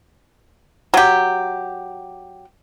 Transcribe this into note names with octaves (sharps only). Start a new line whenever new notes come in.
F#3 G4